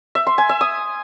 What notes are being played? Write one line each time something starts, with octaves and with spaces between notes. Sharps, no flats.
E5
C6
G#5
E5
D#6